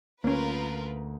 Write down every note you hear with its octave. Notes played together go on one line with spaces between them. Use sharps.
D2 A#3 C#4 F4 A#4 B4